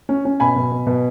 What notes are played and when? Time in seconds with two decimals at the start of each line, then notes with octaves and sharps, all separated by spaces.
0.09 C#4
0.25 C#4
0.40 B2 G#5 B5
0.56 B2
0.72 B2
0.87 B2